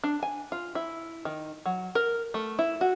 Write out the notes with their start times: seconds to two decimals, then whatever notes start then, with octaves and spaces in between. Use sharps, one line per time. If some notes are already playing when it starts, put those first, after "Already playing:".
0.04 D4
0.23 G#5
0.52 F4
0.75 E4
1.25 D#3
1.66 F#3
1.95 A#4
2.34 A3
2.59 E4
2.81 F#4